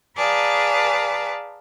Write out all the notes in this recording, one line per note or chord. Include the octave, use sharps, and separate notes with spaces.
G#4 B4 D5 F5 A5 A#5